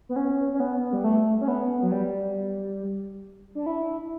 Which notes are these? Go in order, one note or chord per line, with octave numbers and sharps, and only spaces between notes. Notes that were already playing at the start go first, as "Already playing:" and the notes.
B3
C#4
C#4
B3
G3
A3
C#4
B3
F#3
G3
D4
E4